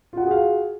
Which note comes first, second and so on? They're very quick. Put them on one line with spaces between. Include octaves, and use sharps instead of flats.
F4 F#5 F#4 G#4 F5